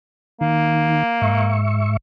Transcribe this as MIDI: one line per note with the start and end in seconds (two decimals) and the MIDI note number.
0.41 1.03 51
0.41 1.59 58
1.21 1.97 44
1.21 1.97 76
1.21 1.97 85